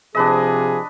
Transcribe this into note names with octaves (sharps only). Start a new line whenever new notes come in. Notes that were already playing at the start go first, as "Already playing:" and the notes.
C3 F3 D4 G#4 B4 D#5